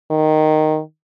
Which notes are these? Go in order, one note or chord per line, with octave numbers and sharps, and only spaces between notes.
D#3